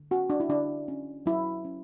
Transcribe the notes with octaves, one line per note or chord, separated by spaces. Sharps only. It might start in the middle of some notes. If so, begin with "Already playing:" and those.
Already playing: D3
C#4 F#4
D4
E4
D3 D4
C#4
F#3 E4
C#4